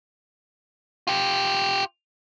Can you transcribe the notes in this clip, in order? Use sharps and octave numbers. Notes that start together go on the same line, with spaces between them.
F4 G4